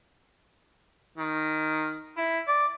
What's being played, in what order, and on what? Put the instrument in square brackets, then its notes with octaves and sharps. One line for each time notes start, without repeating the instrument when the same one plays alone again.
[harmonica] D#3
E4
D5